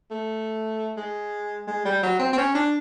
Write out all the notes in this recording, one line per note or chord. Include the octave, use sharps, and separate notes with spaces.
A3
G#3
G#3
G3
F#3
C4
C4
C#4
D4